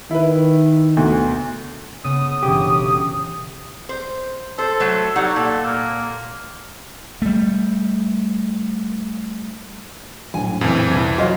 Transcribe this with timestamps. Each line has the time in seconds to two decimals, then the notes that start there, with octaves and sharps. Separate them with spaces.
0.11 D#3 E4 B4
0.97 D2 B2
2.04 C#3 B3 D#6 E6
2.43 G1 B2 E3 C#4 G4
3.89 C5
4.58 A4 C5
4.80 F#3 A3
5.16 F#3 G3 D#4 F#5
5.36 A#2 A4
5.65 A#3
7.22 G3 A3
10.34 A#1 F#2 A2 G#5
10.61 F2 C#3 E3 G#5
10.91 C2 E4
11.18 F#3 F4 C5 C#5 D#5